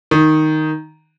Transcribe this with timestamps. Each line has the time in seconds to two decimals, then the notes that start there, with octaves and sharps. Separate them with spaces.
0.11 D#3